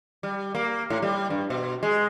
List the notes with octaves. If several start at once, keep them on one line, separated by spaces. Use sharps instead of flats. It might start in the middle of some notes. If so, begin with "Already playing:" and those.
G3
A#3
A2
G3
G2
B2
G#3